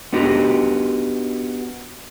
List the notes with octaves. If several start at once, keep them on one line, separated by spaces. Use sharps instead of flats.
B3 D4 D#4 F#4 G4